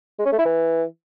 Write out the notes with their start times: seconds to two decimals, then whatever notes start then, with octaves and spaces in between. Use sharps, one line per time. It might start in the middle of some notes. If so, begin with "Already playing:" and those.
0.19 G#3
0.25 C#4
0.32 A3
0.39 E4
0.45 E3